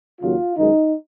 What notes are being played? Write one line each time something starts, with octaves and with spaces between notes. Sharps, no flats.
D#2 C#3 F#3 F4
F#2 D#3 G#3 D#4